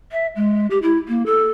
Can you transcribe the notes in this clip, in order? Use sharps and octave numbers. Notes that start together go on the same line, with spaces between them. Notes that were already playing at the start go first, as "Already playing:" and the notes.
E5
G#3
G4
E4
A#3
A4